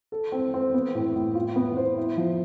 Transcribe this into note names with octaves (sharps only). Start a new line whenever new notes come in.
A4
C4
C4
B3
A2
A2
F4
B3
C5
E4
F3